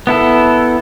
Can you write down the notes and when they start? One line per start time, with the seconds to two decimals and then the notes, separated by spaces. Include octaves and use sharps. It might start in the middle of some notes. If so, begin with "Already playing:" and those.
0.07 B3 E4 A4